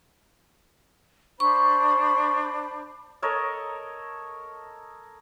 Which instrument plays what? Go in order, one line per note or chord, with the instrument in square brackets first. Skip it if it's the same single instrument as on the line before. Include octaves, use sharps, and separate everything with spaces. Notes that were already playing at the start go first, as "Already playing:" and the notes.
[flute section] D4 C5 B5 [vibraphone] C#6
[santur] A4 A#4 C#5 D#5